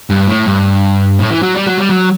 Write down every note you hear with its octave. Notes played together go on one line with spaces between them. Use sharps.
G2
A2
G2
A2
E3
F#3
G3
F#3
G3
F#3